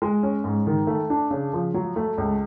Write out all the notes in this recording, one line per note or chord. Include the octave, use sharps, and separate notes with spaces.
G#3
C#4
G#2
D#3
A3
D4
C#3
F3
F#3
A3
C#2